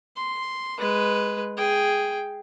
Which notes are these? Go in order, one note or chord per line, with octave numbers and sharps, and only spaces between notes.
C6
G#3 B4
G#4 G5